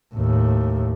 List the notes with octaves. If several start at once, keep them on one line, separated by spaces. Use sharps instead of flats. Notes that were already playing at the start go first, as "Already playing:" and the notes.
D#2 A2